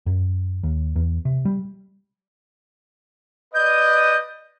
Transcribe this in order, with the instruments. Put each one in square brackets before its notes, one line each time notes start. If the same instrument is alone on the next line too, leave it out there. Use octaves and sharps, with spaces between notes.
[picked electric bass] F#2
D#2
E2
C3
G3
[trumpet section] B4 D5 D#5 [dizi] G6